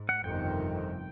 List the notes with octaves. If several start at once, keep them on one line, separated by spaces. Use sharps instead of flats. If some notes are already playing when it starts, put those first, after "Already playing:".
Already playing: G#2
F#5
G1 F2 C3 D#3 G5